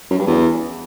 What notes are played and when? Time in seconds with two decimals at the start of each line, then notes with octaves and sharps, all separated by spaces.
0.10 F#2
0.19 G2
0.27 E2